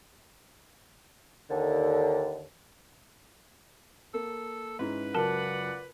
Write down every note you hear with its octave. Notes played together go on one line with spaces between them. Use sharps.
D#2 D3
A#3 A4
G#2 C#4 E4 B4
C#2 F#2 F#3 A#4 D5 F#5 A5